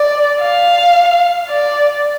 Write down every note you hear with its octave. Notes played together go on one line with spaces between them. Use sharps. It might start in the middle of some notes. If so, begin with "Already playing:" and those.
Already playing: D5
F5
D5